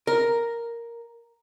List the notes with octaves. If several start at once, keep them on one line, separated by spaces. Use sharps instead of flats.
A#4